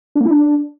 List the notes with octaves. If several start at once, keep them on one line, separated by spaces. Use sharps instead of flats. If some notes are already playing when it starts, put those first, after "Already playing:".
D4
A#3
E4
D4